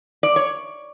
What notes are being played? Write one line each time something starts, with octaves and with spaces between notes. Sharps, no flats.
D5
C#5